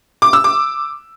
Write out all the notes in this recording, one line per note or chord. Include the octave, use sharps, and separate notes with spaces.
D6
E6
D6